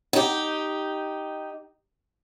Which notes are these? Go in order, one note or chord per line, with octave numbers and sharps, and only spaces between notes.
D#4 G4